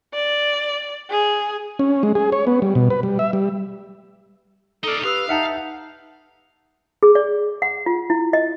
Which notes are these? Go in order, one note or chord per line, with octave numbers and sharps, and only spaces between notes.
D5
G#4
C#4
G#3
G#4
C#5
B3
G3
B2
B4
G3
E5
G3
D#4 A4 D5 F6 G7
G4 B4 F5 D#6 E6
D#4 E5 F#5 A5 F6
G#4
D5
F#5
F4
E4
D#5